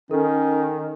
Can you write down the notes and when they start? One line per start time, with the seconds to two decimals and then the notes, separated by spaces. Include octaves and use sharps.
0.11 D#3 C#4 A4